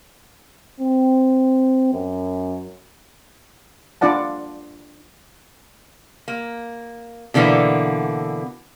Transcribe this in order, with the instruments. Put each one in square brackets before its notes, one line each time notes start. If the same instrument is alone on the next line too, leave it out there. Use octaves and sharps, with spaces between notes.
[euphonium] C4
F#2
[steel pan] D4 F4 D5 F#5 A5
[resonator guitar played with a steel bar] A#3
B2 D3 E3 A#3 B3